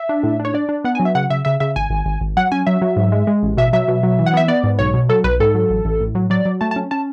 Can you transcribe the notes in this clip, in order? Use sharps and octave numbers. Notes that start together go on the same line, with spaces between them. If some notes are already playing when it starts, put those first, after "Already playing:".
Already playing: E5
D4
A2
D4
C#5
D4 D5
D4
B3 F#5
G#5
F#3
E5
C#3 F#5
C#3 E5
C#3 E5
C#3 E5
G#1 G#5
G#1
G#1
G#1
F#3 F#5
C#4 G#5
F#3 E5
F#3
G#2
G#3
G#3
A1
B2 E5
F#3 E5
B2
F#3
E3
F#5
B3 E5
B3 D5
G#2
B1 C#5
B2
F#3 A4
B1 B4
G#2 A4
F#3
A1
A1
A2
F#3
F#3 D5
F#3
A3 A5
A5
C#4
C#4 A5